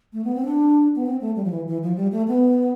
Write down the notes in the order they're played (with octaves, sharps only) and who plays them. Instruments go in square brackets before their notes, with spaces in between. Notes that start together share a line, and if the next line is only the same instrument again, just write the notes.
[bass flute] A3
B3
C4
D4
B3
C4
A3
G3
F3
E3
E3
F3
G3
A3
B3